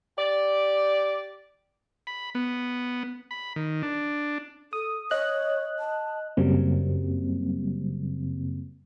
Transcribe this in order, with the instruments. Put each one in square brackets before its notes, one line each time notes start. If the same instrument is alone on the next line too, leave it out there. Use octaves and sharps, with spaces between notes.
[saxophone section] G4 D5
[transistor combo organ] B5
B3
B5
D#3
D4
[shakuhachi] A4 [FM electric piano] D#6
[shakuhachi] C#5 [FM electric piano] D#5 F#6
[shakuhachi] A5
[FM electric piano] F#2 C#3 F#3 G3 A#3 C4